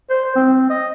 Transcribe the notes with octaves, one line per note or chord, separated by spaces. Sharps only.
C5
C4
D#5